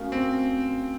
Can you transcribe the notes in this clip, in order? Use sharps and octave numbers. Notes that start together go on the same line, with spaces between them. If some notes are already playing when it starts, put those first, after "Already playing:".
Already playing: A3 C#4 F#4 A#4 F5
C4